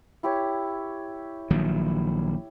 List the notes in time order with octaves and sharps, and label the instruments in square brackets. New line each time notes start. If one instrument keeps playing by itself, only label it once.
[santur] E4 G4 C#5
[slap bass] A#1 D#3 F#3